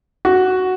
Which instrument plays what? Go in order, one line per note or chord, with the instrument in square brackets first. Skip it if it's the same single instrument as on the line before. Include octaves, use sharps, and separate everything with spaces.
[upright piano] F#4